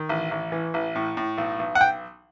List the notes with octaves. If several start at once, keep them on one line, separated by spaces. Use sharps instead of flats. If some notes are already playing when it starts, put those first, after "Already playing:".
Already playing: D#3
A1
A1
E3
A1
A2
A2
B1
B1
F#5
G5